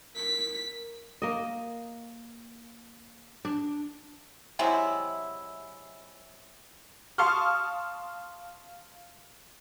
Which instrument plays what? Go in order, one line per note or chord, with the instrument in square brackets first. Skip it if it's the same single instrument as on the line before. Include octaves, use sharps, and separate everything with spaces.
[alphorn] A#4 [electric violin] B6
[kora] A#3 D#5
D4
[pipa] C3 F#3 G#3 E4
[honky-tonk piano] F5 A5 C6 C#6 D#6 F6